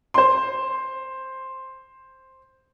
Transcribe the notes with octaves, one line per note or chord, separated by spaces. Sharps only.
C5 C6